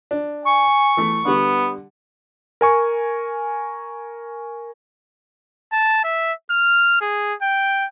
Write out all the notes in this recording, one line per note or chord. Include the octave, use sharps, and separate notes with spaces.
D4
G#5 C#6
E3 A3
D3 G3 B3
A#4 G#5 C#6
A5
E5
F6
G#4
G5